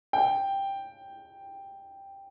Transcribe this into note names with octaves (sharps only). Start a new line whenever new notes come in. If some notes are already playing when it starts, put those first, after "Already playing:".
G5